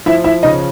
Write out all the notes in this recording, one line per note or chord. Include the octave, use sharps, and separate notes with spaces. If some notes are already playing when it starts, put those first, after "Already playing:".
F3 E4 E5
E4 E5
C#3 D#4 D#5